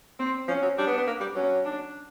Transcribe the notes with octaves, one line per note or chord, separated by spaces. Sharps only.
C4
F3 C#4
F#3
G3 D4
B3
B3
A#3
G3
F#3 C#4
D4